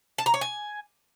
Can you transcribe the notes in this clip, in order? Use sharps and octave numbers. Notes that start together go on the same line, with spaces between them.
A5
A#5
C#5
G#5